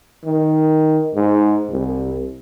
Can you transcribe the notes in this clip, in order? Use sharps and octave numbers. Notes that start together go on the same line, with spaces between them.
D#3
G#2
C2